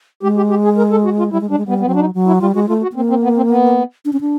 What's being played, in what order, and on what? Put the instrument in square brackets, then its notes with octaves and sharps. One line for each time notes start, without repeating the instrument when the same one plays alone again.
[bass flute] G#3 [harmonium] G4
[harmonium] G4
G4
G#4
A#4
A4
F#4
F4
[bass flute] G3 [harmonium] E4
[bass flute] G#3
[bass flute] G3 [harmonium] D4
[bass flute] G#3
[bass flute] G3 [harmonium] B3
[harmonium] B3
[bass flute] F#3 [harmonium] C4
[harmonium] D4
D#4
[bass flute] F#3
[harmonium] E4
[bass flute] G3 [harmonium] F4
[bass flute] G#3 [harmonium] F#4
[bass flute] A3 [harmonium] F4
[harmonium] F#4
[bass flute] B3
[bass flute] A#3 [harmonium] C4
[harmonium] C4
B3
C4
B3
[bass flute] D4
C#4
D4